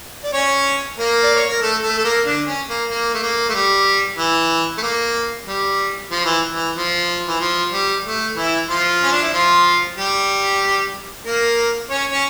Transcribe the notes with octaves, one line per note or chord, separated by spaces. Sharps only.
D5
C#4 C#5
A#3 A#4
D5
C#5
A#4
A3 A4
A3 A4
A4
A#3 A#4
D3 D4
C#4
A#3
A#3
A3
A#3
A3
G3
E3
A3
A#3
G3
F3
E3
E3
F3
E3
F3
G3
A3
E3 E4
F3 F4
C#4
D4
E4
F3 F4
G3 G4
A#3 A#4
C#4 C#5
C#4 C#5